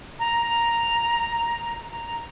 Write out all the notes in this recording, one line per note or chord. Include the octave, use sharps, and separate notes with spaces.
A#5
A#5